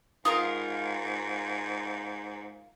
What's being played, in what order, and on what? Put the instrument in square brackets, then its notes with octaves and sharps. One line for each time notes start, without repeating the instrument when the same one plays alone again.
[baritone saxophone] G#2 [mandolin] F4 A#4 A#5 [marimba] D#6